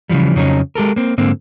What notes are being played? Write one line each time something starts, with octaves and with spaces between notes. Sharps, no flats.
C#3 E3 F3 G3
F2 C#3 F3 F#3 C#4 D#4
G#3 G4 A4 A#4
A#3 C4
G#2 D3 A#3 C4